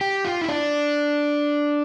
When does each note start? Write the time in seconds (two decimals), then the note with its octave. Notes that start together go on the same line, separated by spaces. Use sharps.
0.01 G4
0.25 F4
0.41 E4
0.49 D4